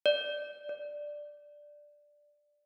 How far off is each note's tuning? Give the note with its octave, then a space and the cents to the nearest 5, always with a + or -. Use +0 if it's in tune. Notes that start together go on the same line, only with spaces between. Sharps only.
D5 +10
D5 +5